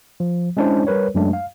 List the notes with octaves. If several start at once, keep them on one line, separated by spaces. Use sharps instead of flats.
F3
G#3 C#4 D4 E4 C5 D5
G3 A#4 B4 C#5
F#2 F#3 G#3 A3 D4
F5